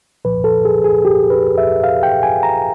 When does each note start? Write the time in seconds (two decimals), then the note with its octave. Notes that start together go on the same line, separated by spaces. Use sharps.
0.25 C2 A#2 F3 B4
0.44 A4
0.65 G#4
0.84 G#4
1.05 G4
1.30 B4
1.58 E5
1.83 F5
2.03 G5
2.23 G#5
2.43 A#5